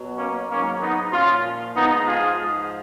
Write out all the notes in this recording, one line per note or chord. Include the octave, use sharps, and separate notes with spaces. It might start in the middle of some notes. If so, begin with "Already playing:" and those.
Already playing: B2 F#3
A#3 C#4
G#2 D#3 F#3 A#3 C#4
B3 D#4
A#2 F3 C#4 F4
G#2 F3 B3 D#4
F4 G#4
G#2 F3